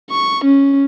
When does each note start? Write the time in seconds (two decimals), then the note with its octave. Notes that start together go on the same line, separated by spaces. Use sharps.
0.11 C#6
0.45 C#4